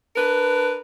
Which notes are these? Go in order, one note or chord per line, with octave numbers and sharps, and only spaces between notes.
D4 A#4 B4